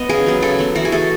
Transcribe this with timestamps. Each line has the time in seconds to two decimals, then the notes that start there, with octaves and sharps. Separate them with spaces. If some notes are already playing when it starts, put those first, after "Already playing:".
Already playing: B3 D#5 F#5
0.09 C#3 G#4
0.26 F#3 B3
0.42 C#3 A4
0.59 F#3 B3
0.75 E3 F#4
0.85 G#4
0.92 A3 A4